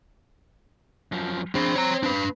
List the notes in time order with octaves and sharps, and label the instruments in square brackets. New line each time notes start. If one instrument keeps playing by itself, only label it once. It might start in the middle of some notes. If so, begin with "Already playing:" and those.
[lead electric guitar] F#2 F3
[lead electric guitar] C4 [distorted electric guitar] D4 G#4
[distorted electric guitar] C#5 A#5
D4 B4